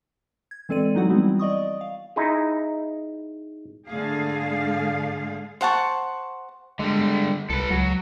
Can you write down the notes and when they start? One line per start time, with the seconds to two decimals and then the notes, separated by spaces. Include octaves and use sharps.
0.51 G#6
0.69 E3 G#3 C4 A4 D5 D#7
0.95 F#3 G#3 D#4 E4 F#4 F#5
1.09 E3 G3 B3 C4 E4 F#4
1.39 D5 D#5 C#6 D#6
1.81 F5
2.16 D#4 E4 G#4
3.88 G#2 D3 G#3 A3 G#4 F5
5.61 C5 F#5 A5 C#6
6.79 D3 G3 G#3
7.50 C2 A4 B4
7.70 C#2 F#3